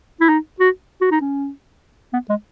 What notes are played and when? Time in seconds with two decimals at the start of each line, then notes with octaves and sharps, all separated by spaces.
0.21 E4
0.29 D#4
0.60 F#4
1.01 F#4
1.11 D#4
1.21 C#4
2.13 B3
2.30 G#3